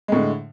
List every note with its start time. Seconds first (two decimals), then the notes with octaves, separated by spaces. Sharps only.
0.08 G#3
0.12 A2
0.16 D3